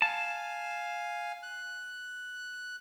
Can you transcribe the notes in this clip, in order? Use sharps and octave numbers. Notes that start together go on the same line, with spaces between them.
F5 G#5 A5
F#6